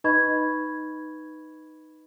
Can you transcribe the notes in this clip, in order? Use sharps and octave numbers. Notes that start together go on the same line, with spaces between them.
D#4 B4 D#5 B5 C#6 G#6